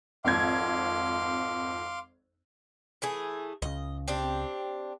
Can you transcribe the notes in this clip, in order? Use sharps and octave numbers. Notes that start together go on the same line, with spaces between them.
G#1 F2 F5 C6 D6 G#6
E3 A3 G#4
C#2 C#3 D#5
C4 D4 G4